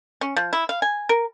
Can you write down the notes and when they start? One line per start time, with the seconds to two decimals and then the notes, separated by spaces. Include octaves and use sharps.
0.21 C#4
0.36 F3
0.53 E4
0.69 F5
0.82 G#5
1.09 A#4